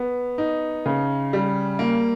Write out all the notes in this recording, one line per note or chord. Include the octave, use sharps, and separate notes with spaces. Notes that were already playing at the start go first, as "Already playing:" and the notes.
Already playing: B3
D#4
C#3
G3
A#3